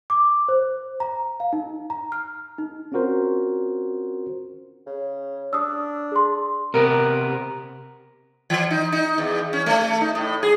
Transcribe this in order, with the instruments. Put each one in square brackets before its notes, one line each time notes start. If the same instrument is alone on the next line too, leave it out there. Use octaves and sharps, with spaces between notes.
[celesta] D6
C5
A#5
F5
D#4
A#5
F6
D#4
[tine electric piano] C4 C#4 F4 F#4 A#4 C5
[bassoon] C#3
[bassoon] D4 [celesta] D#6 E6
[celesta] G#4 C6
[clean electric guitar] C3 B3 [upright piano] A#4
[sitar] E3
D#4
D#4
E2
C#4
A3
D#4
A2
G#4